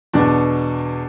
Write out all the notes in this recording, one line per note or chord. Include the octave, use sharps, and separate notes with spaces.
E2 B2 B3 D4